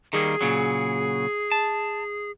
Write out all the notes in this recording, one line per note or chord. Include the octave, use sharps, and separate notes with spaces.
D#3 G3 A#3 G#4
A#2 C#3 F#3
A5